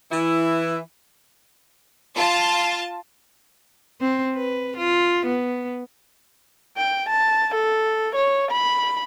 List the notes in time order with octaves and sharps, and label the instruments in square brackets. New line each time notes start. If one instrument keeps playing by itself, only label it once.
[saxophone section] E3 E4
[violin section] F4 A5
[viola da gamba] C4
B4
F4
B3
[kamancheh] G5
A5
A4
C#5
B5